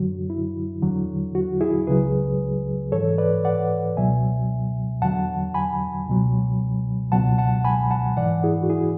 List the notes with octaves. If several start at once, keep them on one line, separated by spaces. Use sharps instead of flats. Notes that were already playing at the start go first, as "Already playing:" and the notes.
Already playing: F#2 D3 F#3 F#4
E4
E2 D3 F#3
F#4
E4 G#4
C#2 C#3 F#3 G#4 B4
G#2 E3 A4 C#5
B4 D5
D5 F#5
C#2 B2 F#3 E5 G#5
E2 D3 F#3 F#5 A5
G#5 B5
C#2 B2 F#3
C#2 B2 F#3 F#5 A5
F#5 A5
G#5 B5
F#5 A5
G#2 E3 D5 F#5
E4 G#4
F#4
E4 G#4